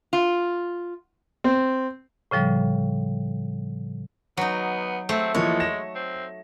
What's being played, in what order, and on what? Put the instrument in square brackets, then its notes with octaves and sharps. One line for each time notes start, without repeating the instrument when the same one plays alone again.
[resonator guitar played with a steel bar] F4
[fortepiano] C4
[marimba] A2 C#3 F3 G3
[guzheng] F#3 D#4 [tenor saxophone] B3
[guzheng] A3 [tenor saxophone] C4
[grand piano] E3 F3 A#3 [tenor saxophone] G#3 [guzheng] C#5
[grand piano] A#6 E7
[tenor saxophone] C4